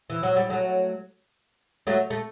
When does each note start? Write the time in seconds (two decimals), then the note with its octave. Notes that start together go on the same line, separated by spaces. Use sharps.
0.10 E3
0.23 F#3
0.37 G3
0.50 F#3 A3
1.87 F#3 A3
2.10 A3